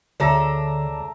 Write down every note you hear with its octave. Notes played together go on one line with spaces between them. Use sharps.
D2 D3 D4 G#4 A4 C#5 E5 A#5